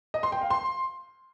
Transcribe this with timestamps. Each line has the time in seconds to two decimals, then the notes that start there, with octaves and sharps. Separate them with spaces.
0.14 D#5
0.23 C6
0.32 G5
0.41 F5
0.50 C6